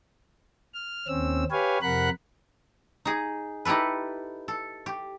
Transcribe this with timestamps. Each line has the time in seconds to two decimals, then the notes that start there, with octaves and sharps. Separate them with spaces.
0.74 F6
1.08 D#2 C4 C#4 E6
1.51 G4 B4 C#5 F5 G#5
1.82 F2 C3 A#4 F#5 B5 F#6
3.05 D#4 G#4
3.65 D#4 E4 G4 A4 B4
4.48 A4
4.86 G4